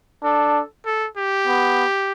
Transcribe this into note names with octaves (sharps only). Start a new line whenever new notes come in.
D4 A4
A4
G4
B3